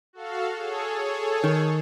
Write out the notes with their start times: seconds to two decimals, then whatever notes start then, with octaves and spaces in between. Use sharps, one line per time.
0.13 F#4 A4 F5
0.55 G#4 A4 C#5
1.44 D#3